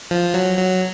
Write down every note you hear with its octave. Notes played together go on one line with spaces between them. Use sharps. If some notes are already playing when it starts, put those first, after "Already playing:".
F3
F#3
F#3